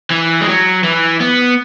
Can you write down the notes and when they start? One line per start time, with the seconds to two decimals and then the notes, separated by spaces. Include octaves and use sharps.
0.10 E3
0.41 G#3
0.47 F#3
0.83 E3
1.20 B3